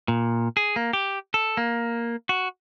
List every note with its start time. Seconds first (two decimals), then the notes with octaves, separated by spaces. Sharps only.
0.08 A#2
0.57 G#4
0.76 A#3
0.93 G4
1.34 A4
1.57 A#3
2.29 F#4